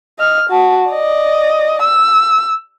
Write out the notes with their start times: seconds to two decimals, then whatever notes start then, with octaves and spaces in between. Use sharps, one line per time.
0.19 D#5 F6
0.50 F#4 A5
0.91 D5 D#5
1.82 E6